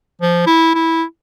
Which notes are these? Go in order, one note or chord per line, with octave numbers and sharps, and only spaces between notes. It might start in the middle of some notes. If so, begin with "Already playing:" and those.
F3
E4
E4